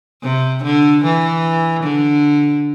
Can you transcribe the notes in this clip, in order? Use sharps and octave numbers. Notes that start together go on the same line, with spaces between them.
C3
D3
E3
D3